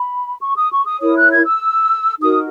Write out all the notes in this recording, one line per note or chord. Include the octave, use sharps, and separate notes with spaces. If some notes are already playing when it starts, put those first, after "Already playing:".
Already playing: B5
C#6
D#6
C#6
D#6
E4 A#4 C#5 D#6
F#6
G#6
E6
D#4 F#4 A#4 D#6